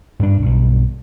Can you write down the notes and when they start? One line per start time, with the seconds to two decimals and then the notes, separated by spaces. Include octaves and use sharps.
0.19 G2 D4
0.42 B1 G2